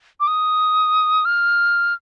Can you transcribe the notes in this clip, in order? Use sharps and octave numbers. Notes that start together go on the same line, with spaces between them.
D6
D#6
F6